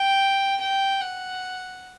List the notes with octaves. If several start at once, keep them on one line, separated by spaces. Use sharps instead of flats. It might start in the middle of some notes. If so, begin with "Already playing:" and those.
Already playing: G5
G5
F#5